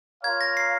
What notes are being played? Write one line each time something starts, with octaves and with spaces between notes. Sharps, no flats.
F4 A#4 C#5 F5 G#6
A#6
C7